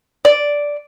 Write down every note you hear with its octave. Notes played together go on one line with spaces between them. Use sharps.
D5